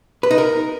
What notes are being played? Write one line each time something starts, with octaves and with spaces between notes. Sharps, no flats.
B4
D#4
A#4